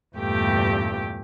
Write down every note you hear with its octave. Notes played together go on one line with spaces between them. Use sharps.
E2 G2 A#2 A3 G4 G5